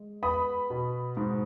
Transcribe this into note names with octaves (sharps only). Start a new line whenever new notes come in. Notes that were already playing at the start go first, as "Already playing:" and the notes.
Already playing: G#3
B3 B5 D#6
B2
G#2